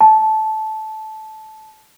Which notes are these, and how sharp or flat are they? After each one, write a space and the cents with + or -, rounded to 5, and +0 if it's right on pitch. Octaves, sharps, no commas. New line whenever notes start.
A5 -15